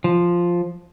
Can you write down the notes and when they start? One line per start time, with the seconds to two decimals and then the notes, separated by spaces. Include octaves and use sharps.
0.04 F3